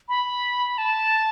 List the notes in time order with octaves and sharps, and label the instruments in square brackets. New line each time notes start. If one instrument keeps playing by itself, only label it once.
[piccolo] B5
A5